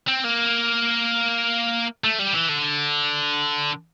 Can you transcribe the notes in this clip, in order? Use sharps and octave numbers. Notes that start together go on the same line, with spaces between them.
C4
A#3
A3
G3
E3
D3